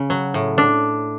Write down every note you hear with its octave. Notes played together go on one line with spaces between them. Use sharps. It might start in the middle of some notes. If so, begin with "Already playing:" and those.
Already playing: C#3
F#3
A2
D4